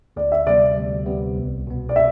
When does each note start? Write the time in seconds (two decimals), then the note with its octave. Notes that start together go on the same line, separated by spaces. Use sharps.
0.16 D2 D5
0.32 E5
0.47 C3 G3 B3 D5
0.77 D2
1.06 C3 G3 B3
1.36 C2
1.67 B2 B3
1.89 D5
1.96 E5